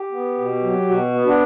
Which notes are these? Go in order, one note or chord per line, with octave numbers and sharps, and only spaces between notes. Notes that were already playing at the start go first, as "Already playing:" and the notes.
Already playing: G4
B3
B2
F#3
B2 F#4
B3
D4